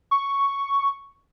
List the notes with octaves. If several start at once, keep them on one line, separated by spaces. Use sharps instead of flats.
C#6